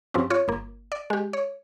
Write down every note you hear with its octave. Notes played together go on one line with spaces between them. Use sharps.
G2 F3 C4 C#4
F4 C#5
G1 A#3
D5
G#3 G4
C#5